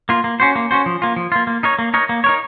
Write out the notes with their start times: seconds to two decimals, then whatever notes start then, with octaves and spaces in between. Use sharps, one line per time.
0.09 A#3 F4
0.24 A#3
0.40 C#4 F#4 C5
0.56 A#3
0.71 C#4 F#4 C5
0.86 F3
1.02 A#3 F4
1.16 F3
1.32 A#3 F4
1.47 A#3
1.63 D#4 A#4 C#5
1.79 A#3
1.94 D#4 A#4 C#5
2.09 A#3
2.24 D#4 A#4 C#5